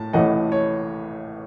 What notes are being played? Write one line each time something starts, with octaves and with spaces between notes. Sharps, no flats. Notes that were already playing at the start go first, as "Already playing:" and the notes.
Already playing: A2 A3 A5
A1 A2 E3 A3 D#5 F#5
C#5